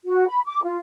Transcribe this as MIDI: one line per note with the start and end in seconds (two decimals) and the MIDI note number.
0.05 0.27 66
0.28 0.40 83
0.46 0.62 86
0.63 0.77 65